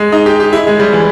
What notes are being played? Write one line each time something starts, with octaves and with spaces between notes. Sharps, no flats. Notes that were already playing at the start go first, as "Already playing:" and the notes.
Already playing: G#3
D#4
G4
G4
E4
G#3
G3
E3